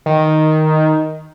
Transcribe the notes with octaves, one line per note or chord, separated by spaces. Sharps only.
D#3